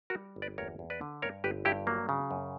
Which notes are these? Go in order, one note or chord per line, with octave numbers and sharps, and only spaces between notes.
F#4 A#4
G3
G1
B4 D5
E2 A#4 C#5
E2
B4 D5
D3
G2 A#4 C#5
G1 G4 B4
G2 E4 G4
F#3 A#3
C#3
F#2